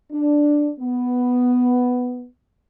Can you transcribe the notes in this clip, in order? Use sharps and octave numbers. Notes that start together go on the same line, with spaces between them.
D4
B3